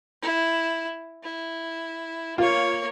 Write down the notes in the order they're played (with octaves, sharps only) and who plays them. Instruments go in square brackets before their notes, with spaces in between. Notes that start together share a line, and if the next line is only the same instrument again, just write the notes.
[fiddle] E4
E4
[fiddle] A#3 C#5 [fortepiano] F4